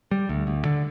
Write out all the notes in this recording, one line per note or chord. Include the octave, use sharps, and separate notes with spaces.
G3
D2
D2
D3